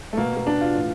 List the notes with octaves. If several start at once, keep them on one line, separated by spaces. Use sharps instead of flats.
A3
B2 A#3
A#3
B2 D4
F4
A2 E3